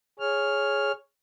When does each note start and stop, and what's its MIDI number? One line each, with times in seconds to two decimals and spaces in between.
0.20 0.92 68
0.20 0.92 73
0.20 0.92 89